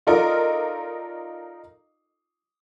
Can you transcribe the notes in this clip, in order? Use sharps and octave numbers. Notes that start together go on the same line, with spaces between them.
D#4 F4 A4 A#4 D5 D#5